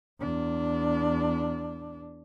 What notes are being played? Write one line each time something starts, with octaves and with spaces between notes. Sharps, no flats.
E2 D4